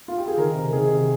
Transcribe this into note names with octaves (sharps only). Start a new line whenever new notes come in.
F4
G4
G#4
D#3 A#4
C3
D#3 G#4
C3